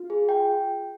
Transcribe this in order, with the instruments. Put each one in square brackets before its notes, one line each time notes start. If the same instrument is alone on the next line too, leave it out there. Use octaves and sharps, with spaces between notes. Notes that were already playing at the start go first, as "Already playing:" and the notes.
Already playing: [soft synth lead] F4
[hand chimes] G#4
G5